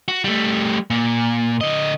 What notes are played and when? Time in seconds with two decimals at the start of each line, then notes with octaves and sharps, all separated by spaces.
0.08 F#4
0.24 G3 A3
0.90 A#2
1.61 D3 D#5